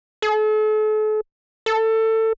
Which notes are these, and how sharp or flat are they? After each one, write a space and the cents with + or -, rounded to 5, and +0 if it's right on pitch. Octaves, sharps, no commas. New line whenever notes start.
A4 -40
A4 +20